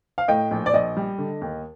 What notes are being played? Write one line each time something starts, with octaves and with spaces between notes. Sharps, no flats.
F5
A2 D#5 G5
A#1
D5
A#1 D#5
G3
D3
D#2